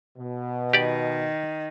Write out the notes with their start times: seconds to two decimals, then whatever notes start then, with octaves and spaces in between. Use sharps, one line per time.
0.17 B2
0.73 D#3 G4 D5